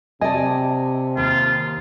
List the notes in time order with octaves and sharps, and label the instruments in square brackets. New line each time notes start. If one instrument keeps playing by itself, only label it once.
[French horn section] C3 [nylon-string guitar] D5 D#5 [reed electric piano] G#5 A5
[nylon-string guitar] D#2 [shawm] F4